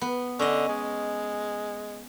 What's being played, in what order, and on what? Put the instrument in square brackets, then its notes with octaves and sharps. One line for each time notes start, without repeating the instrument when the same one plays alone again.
[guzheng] B3
[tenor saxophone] D3 [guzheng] C#4 D#5
[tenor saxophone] G#3